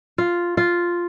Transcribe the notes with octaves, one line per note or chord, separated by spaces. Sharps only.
F4
F4